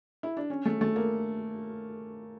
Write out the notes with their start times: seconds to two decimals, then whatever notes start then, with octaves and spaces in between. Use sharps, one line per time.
0.23 E4
0.37 D4
0.50 C#4
0.65 A3
0.81 A3
0.96 A#3